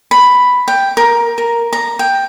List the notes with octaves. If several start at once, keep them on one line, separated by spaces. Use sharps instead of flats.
B5
G5
A#4
A#4
A#5
G5